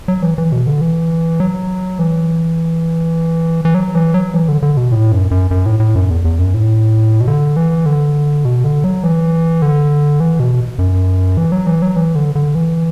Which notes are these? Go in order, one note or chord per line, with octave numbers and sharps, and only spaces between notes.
F#3
E3
E3
B2
D3
E3
F#3
E3
E3
F#3
E3
F#3
E3
D3
D3
B2
A2
F#2
F#2
F#2
A2
A2
F#2
E2
E2
F#2
A2
B2
D3
E3
D3
B2
D3
F#3
E3
D3
E3
B2
F#2
E3
F#3
E3
F#3
E3
D3
D3
E3